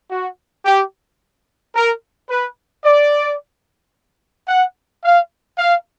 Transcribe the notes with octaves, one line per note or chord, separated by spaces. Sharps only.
F#4
G4
A#4
B4
D5
F#5
F5
F5